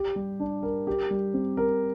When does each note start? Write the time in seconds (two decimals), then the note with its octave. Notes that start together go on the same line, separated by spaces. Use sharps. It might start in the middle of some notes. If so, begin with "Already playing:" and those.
Already playing: G4
0.16 G3
0.40 D4
0.63 A#4
0.87 G4
1.10 G3
1.34 C4
1.57 A#4